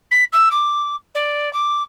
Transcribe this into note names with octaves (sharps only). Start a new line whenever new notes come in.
B6
E6
D6
D5
D6